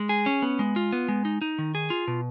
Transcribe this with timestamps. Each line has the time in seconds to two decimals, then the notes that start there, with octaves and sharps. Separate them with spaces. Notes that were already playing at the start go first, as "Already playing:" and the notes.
Already playing: G#3
0.09 G#4
0.26 C#4
0.42 B3
0.59 G#3
0.76 F4
0.93 B3
1.09 G#3
1.25 D#4
1.41 D#4
1.58 D#3
1.75 G#4
1.90 F4
2.08 B2